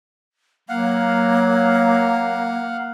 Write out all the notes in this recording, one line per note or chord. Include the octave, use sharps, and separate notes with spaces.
F#3 A#3 F5 F#5